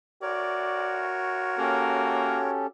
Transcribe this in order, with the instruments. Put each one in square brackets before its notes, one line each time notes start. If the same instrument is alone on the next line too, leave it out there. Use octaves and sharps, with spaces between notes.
[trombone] F#4 [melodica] A#4 C#5 [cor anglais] D5
[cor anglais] A#3 [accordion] C#4 G4 A4